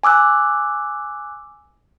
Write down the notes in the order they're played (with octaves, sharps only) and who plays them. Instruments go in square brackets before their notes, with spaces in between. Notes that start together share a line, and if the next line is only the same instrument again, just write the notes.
[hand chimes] G#5 D6 E6 F#6